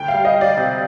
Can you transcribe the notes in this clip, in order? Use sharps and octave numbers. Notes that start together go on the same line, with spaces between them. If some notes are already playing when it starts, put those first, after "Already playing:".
Already playing: D2 G5
F5
G3
D#5
G3
D5
C3